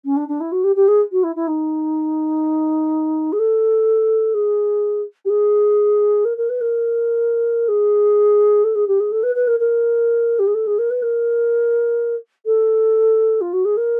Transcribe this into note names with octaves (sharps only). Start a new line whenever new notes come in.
C#4
D4
D4
E4
F#4
G4
G4
G#4
F#4
E4
E4
D#4
G#4
A4
G#4
G4
G#4
A#4
A#4
B4
A#4
G#4
A4
G#4
G4
G#4
A4
B4
B4
A#4
A#4
G4
G#4
A4
G#4
A#4
B4
A#4
A4
F4
F#4
G#4
A#4